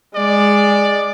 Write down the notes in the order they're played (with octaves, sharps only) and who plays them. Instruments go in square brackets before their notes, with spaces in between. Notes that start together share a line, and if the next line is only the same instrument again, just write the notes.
[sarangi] G#3 [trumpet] D5